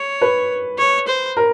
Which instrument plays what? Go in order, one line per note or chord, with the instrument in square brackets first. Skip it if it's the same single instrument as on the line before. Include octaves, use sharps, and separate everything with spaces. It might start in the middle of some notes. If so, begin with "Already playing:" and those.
Already playing: [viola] C#5
[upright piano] B4
[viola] C#5
C5
[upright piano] A#4